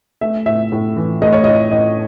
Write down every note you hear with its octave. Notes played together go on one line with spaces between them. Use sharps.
A3 E5
A2 E5
A2
E3
A3 D#5
C#5
A2 D#5
A2 D#5